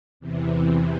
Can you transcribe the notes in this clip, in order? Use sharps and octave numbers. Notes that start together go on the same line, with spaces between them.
E2 C3 E3